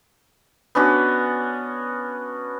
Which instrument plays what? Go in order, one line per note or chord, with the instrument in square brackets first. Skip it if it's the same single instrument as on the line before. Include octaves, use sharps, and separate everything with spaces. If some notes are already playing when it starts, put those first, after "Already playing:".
[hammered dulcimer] B3 C#4 D4 F#4